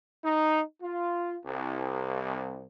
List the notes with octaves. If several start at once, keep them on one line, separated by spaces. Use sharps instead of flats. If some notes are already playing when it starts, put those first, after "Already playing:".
D#4
F4
C2